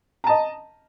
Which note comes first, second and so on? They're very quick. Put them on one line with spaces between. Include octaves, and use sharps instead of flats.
A#5 A5 D#5